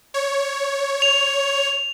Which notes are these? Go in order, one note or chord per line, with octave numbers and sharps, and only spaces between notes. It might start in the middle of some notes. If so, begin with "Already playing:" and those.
C#5
F7